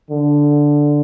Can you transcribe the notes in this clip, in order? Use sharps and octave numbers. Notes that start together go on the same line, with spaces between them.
D3